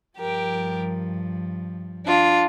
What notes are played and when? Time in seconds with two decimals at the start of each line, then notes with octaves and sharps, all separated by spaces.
0.18 G2 F3 G4 A#4
2.06 D4 F4